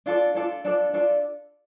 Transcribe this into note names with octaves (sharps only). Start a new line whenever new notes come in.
D4 F4 A4 D5
D4 F4 A4 D5
D4 F4 A4 D5
D4 F4 A4 D5